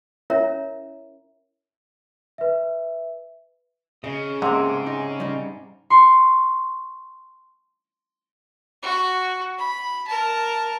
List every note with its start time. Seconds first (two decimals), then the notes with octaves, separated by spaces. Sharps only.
0.30 C#4 E4 A#4 C#5 E5 A#5
2.38 B4 E5
4.04 C#3 D#5
4.42 G#2 C3 G#3 A#3
4.87 D#4
5.20 G3 D#4
5.90 C6 C#6
8.82 F#4
9.58 B5
10.08 A#4 A5